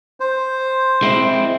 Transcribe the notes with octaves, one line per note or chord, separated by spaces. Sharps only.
C5
G#3 C4 E4